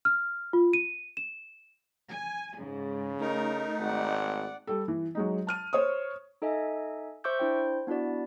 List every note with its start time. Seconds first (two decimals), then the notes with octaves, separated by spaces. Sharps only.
0.05 F6
0.53 F4
0.73 D#7
1.17 E7
2.07 G#5
2.58 G#2 C#3
3.20 A3 D#4 A#4
3.80 G#1 D5 F#5
4.67 G3 A4
4.88 E3
5.15 F#3 G#3 D#4
5.47 A5 F6 D#7
5.73 C5 C#5 C#6 D#6
6.42 D#4 A4 D#5 E5 G#5
7.24 C5 E5 C#6 D6 E6 G6
7.38 D4 E4 C5 G5 G6
7.87 B3 D4 E4 F#4 D5